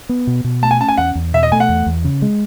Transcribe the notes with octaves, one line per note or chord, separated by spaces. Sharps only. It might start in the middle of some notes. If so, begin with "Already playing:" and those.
B3
B2
B2
A3 A5
G#5
C#4 A5
G#5
E2 F#5
E2
B2 E5
D#5
A3 G#5
F#5
E2
E2
C#3
G#3